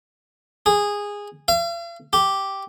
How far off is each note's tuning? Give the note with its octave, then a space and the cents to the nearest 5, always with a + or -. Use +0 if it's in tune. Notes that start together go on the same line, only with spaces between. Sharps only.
G#4 -15
F5 -45
G4 -5